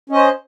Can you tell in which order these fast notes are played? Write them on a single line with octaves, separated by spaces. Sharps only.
C#4 D#5 C5